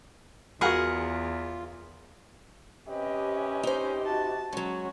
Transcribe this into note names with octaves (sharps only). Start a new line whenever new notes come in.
E2 F4 F#4 G#4 A#4 F5 F#5 B5
C3 C#4 G4 B4 D#5
D#4 C5
F#4 A5
F#3 G#3 C#4 F#4